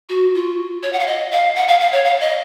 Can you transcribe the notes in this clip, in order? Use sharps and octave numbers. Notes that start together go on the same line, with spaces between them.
F#4
F4
C#5
F#5
F5
D#5
F5
F#5
F5
F5
C#5
F5
D#5